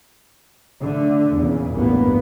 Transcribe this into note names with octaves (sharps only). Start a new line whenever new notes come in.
D3 A3
E2 A#2 C#3
A1 E2 G2 A#3 B3